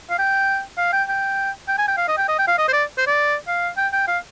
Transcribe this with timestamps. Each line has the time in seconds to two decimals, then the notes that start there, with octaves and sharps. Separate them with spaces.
0.10 F5
0.19 G5
0.78 F5
0.93 G5
1.09 G5
1.68 G5
1.78 G#5
1.88 G5
1.97 F5
2.08 D#5
2.17 G5
2.28 D#5
2.38 G5
2.47 F5
2.58 D#5
2.68 C5
2.73 D5
2.98 C5
3.07 D5
3.48 F5
3.77 G5
3.93 G5
4.07 F5